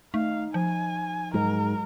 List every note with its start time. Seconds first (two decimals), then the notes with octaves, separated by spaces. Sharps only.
0.14 A3 D#4 F5
0.54 F3 G#5
1.34 G#2 F#3 G#3 A#4